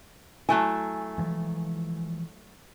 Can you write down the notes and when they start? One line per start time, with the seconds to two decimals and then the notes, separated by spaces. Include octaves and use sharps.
0.49 F#3 A3 E4 G#5
1.18 E3 F3 G#3